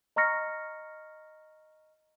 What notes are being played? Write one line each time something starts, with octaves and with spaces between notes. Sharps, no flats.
D#5 A#5 C#6 F6 A#6 C#7